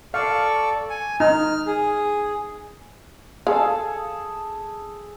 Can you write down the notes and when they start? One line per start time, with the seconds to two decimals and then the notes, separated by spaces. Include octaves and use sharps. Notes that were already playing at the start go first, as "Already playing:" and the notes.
0.14 A4 D5 F5 C#6
0.89 G#5
1.20 D#4 F6
1.66 G#4
3.47 G#4 A4 F5 A5